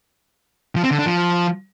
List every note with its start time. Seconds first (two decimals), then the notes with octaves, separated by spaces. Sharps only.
0.76 F3
0.83 C4
0.91 D3
0.99 D4
1.06 F3